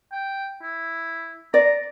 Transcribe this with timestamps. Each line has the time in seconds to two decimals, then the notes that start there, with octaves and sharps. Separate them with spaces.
0.12 G5
0.62 E4
1.54 D5 A#5